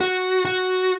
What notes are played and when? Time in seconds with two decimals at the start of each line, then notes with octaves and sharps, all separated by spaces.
0.01 F#4
0.45 F#4